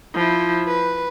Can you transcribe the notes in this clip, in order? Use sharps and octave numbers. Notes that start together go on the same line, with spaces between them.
F3 E4
B4